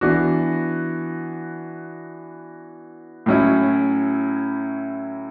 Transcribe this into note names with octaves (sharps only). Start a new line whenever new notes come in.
E3 B3 D4 F#4
A2 F#3 C#4 E4